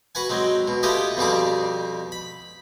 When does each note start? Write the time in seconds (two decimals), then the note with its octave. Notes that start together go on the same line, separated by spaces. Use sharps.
0.15 F#4 B4 F#5 G#5
0.30 F#3 G#3 C4
0.68 B2
0.83 A3 F4 G4 B4 D#5 G#5
1.17 F2 B2 G3 G#4 D6
2.12 B5